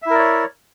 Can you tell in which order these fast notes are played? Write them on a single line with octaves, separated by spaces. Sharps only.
E5 E4 A#4 D5 C#5